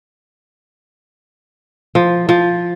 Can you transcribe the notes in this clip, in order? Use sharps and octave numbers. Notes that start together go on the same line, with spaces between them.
F3
F3